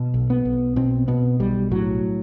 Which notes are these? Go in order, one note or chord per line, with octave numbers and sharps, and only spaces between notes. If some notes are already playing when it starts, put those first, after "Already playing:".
Already playing: B2
B1
B3
B1
B2 C4
B2 B3
B1 G3
A2 F#3